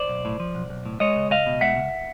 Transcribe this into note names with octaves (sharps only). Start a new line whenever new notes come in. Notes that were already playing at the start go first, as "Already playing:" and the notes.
Already playing: C5 D5
B1
A2
F3
B1
B1
A2
G#3 C#5 D#5
C#2
C#2 D#5 F5
B2
G#3 E5 F#5
C#2